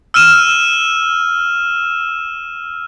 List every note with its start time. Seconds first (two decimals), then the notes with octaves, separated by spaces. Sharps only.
0.14 E6 F6 D#7 E7